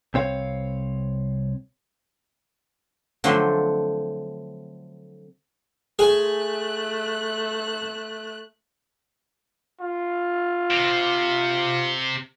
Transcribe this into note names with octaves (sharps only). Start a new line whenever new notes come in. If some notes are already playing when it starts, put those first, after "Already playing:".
C2 C4 C#5 F5
D3 F3 F#3 A3 C4 D4
A3 G#4 G#5 F#6
F4
C3